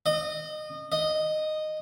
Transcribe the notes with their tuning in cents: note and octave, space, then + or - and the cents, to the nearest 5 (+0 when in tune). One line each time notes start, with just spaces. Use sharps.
D#5 -25
D#5 -10